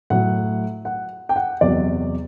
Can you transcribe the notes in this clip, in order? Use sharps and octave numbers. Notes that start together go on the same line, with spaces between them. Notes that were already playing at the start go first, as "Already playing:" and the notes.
A2 F#3 A3 F#5
F#5
G5
F#5
E2 C3 F#3 D5